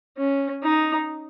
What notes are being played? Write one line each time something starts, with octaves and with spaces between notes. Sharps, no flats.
C#4
D#4